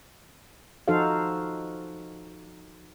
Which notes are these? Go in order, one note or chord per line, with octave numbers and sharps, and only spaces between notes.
F3 D#4 F#4 A4 C5 F5